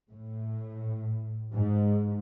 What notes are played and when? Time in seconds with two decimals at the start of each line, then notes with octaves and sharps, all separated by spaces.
0.11 A2
1.53 G#2